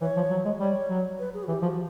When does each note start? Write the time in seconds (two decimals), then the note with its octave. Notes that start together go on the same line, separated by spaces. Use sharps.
0.01 E3 C#5
0.17 F3
0.31 F#3
0.45 G#3
0.60 G3 C#5
0.90 F#3
1.19 B4
1.34 G#4
1.43 F#4
1.48 E3 G4
1.63 F3 F#4